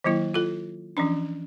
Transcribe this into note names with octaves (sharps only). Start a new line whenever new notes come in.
D#3 F#3 A#3 E4
F4 A4
E3 F3 C#4 D4